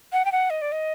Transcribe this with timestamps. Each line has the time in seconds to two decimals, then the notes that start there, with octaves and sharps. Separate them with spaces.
0.12 F#5
0.25 G5
0.32 F#5
0.50 D#5
0.62 D5
0.72 D#5